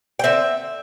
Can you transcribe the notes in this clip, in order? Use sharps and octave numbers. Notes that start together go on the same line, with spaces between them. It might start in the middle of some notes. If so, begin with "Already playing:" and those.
G5
D3 C4 E5